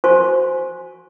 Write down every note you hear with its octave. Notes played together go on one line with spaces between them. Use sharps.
F#4 C5 G#5 A5 C6 C#6